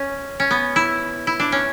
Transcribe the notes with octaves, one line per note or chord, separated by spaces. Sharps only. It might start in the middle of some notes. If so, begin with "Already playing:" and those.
Already playing: C#4
C#4
B3
E4
E4
D4
C#4